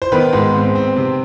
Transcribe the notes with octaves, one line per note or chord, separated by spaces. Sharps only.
C5
D#3 B3 B4
G#2
C4
C4
C3